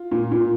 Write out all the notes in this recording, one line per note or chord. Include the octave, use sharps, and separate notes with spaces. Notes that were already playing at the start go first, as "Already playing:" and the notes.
Already playing: F4
A#2
A#2